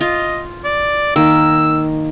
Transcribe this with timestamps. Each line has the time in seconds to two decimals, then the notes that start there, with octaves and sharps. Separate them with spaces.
0.01 F4 D#5
0.64 D5
1.16 D#3 A#3 E6